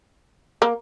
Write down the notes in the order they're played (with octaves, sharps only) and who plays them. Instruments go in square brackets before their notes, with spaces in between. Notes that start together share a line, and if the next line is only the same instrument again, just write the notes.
[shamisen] A#3